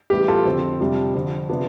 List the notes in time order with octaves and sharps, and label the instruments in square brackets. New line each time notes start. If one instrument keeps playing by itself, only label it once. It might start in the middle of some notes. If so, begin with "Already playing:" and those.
[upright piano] A1 A2 G3 B3 G4
F4 A4
F2 D3 F3 C4
F2 C3 G3 D4
F2 D3 F3
C3 F3 B3 D4